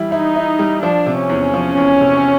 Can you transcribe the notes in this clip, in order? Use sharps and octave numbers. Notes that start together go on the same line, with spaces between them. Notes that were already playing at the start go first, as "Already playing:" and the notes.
Already playing: E3 G3 E4
D#4 E4
E4
G3
F3 D4
C3
C#4
E2
F3
E2
C3